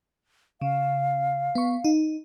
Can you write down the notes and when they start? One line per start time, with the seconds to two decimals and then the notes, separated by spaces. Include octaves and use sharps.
0.61 C#3 F5
1.55 B3 C#6
1.84 D#4